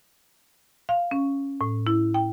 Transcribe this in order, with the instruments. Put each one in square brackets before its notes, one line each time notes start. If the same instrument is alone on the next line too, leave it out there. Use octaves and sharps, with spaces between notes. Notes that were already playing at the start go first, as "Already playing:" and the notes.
[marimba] F5
C#4
A2
E4
G5